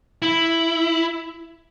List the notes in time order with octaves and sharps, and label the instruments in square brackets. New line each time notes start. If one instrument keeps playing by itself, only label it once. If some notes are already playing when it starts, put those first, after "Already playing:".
[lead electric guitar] E4